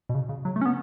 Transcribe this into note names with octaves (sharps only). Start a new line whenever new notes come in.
B2
C#3
C#3
F#3
A3
C#4
B3